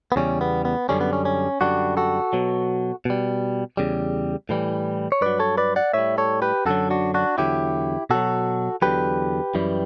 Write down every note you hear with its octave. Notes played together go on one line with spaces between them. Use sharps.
B3
E2 C#3 G3 C#4
B3
B3
F#2 D3 G3 C#4
B3
C#4
C#4
F#2 D3 G3 D4 F#4
F#4 A4
B2 F#3
B2 G3
E2 C#3 G3
A2 E3 G3
C#5
G2 F#3 B4 D5
A4 C#5
B4 D5
D5 F#5
A2 G3 C#5 E5
A4 C#5
G4 B4
F#2 D3 F#3 F#4 A4
D4 F#4
D4 F#4
E2 D3 F#3 E4 G4
B2 F#3 F#4 A4
E2 D3 F#3 G4 B4
F#2 E3 G3